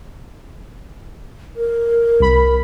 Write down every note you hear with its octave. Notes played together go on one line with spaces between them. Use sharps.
A#4
C2 B5